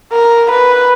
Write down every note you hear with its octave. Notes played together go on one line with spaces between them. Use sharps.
A#4
B4